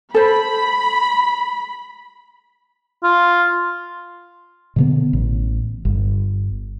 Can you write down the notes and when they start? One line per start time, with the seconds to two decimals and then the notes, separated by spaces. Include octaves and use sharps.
0.14 A4 C5 B5
3.03 F4
4.76 B2 D3 B3
5.13 A1
5.85 G1